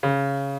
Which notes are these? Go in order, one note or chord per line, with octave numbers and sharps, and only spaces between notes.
C#3